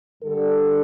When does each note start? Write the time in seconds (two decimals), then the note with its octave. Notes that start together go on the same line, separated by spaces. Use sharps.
0.23 G2 D3 G3 A4